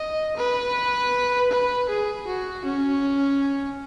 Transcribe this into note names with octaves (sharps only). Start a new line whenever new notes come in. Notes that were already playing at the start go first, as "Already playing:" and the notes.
Already playing: D#5
B4
B4
G#4
F#4
C#4